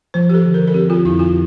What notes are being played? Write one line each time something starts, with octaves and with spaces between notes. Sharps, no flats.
F3 C5
G4
A4
D3
A#4
A4
C4 G4
F4
F2 E4
F4